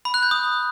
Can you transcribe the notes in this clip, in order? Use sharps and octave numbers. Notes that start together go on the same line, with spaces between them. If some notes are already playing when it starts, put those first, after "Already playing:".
B5
F#6
G6
D#6